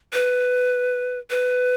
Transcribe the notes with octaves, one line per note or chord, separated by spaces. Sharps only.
B4
B4